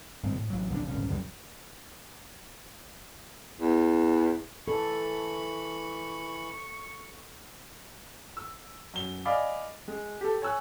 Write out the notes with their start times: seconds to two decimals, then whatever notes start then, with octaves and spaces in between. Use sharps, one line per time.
0.23 G#1 G2 G#3 C4
0.36 A2
0.50 A1 F#3
0.70 D1 A#1 C3 D4
0.88 D#1 G#1 C#2 C#4
1.08 C#2 F#2 D3 G3
3.60 E2
4.68 E3 A4 B5 C#6
8.37 E6
8.94 F#2 G7
9.25 D5 D#5 F5 G#5 B5 D6
9.88 G#3
10.21 G4 A4
10.42 C#5 G#5 E6 F#6